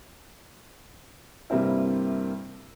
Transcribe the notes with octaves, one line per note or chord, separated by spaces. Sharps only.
G2 C3 G3 A#3 C4 E4